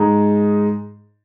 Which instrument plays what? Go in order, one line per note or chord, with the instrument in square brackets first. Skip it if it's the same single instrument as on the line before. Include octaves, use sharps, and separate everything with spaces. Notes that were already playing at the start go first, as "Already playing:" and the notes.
Already playing: [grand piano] G#2 G#3 D#4